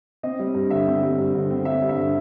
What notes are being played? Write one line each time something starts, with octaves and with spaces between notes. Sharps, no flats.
C4 D#5
G3
G2
D3 E5
C4
G3
G2
D3
C4
G3 E5
G2
E5
D3